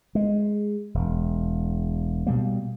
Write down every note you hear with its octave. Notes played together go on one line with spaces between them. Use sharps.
G#3
E1
B2 G3 A#3